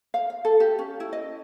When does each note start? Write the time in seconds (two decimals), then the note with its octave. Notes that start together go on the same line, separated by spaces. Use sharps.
0.14 F5
0.30 F5
0.45 A4
0.60 G4
0.79 C#4
1.00 E4
1.13 D#5